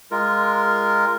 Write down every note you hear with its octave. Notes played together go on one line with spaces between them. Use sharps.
G#3 F4 A#4